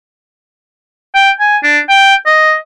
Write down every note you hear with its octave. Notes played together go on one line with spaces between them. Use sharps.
G5
G#5
D4
G5
D#5